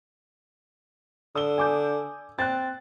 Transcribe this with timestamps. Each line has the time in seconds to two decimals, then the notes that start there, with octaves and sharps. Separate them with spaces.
1.35 D3 D#6 E6 G7
1.58 G#5 D6 G6
2.39 C4 F#6 A6